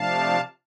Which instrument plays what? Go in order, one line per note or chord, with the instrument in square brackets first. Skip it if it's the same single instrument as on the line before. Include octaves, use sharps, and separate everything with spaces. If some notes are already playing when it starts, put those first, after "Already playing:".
Already playing: [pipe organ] C3 F3 A3 D4 F5 A5